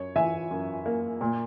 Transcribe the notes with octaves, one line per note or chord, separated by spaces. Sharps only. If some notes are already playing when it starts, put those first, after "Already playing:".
Already playing: F#2 C#5
E3 E5 G#5
F#2
A#3
A#2